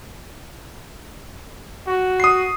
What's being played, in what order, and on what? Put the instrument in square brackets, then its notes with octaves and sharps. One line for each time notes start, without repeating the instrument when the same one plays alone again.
[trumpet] F#4
[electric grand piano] D#6 C7